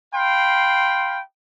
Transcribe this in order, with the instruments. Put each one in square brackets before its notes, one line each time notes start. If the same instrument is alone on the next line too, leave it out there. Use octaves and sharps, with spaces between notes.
[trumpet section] F5 G5 B5 C6